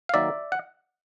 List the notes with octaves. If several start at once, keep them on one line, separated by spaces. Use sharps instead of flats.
F5
D#3 F#3 A#3 D5 E5
F#5